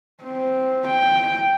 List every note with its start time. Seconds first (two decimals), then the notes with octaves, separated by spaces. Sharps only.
0.23 C4
0.87 G5